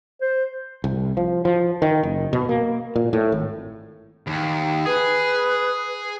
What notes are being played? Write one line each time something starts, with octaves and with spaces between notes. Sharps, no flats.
C5
C2
F3
F3
D#3
F#1
B2
A#3
A#2
A2
G#1
D#2
G#4 B4